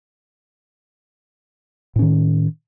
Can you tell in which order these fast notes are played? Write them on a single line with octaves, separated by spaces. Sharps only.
A2 C#4 D#3